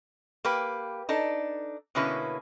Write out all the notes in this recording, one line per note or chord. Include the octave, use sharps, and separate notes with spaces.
A#3 G4 B4
D4 D#4 A4
B2 D3 A#3 C#4 E4 B4